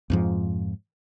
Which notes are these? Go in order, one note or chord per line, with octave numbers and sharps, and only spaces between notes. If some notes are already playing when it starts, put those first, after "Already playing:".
F2 G#2 F3